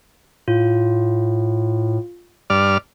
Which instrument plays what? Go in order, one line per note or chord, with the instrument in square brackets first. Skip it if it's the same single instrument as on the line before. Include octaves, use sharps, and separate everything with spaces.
[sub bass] A2 [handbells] F4
[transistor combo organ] G2 D5 F6